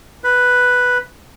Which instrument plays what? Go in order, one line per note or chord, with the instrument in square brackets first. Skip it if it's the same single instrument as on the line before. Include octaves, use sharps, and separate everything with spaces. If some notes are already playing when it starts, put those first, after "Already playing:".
[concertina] B4